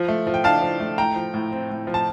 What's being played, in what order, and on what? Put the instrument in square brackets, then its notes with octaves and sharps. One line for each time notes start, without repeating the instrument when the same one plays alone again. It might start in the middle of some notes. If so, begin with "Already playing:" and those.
Already playing: [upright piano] F3
A3
F3
G5
D4 F5 A5
F3
A3
A2 G5 A#5
F3
A2
C4
A2
F3
A5